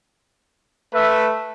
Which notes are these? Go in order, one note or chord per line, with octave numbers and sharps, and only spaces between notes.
A3 B4 E5